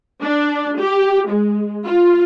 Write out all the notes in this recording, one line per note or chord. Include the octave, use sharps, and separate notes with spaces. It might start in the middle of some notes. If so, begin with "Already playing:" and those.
D4
G4
G#3
F4